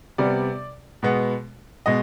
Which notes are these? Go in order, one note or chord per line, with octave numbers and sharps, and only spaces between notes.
C3 G3 B3 D5
B2 G#3 B3
B2 G#3 D#5